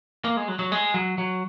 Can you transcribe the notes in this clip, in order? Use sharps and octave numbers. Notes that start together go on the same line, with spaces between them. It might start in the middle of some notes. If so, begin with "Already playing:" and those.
A#3
G#3
F#3
F#3
G#3
F#3
F#3